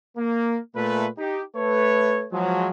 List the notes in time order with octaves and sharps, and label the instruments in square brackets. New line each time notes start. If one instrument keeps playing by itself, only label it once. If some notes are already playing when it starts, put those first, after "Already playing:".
[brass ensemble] A#3
A#2 A3 B4
D#4 G4
A3 B4 C#5
F3 F#3 G#3